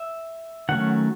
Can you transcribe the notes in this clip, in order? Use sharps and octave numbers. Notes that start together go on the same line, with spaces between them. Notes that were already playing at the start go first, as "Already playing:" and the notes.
Already playing: E5
D#3 F#3 A3 C#4 F#5